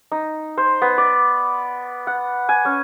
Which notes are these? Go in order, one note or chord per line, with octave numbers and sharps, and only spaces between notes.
D#4
C5
B3
D5
F#5
G#5
C#4